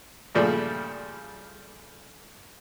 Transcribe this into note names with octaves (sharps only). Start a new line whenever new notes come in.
G2 A#2 C#3 F3 G3 A3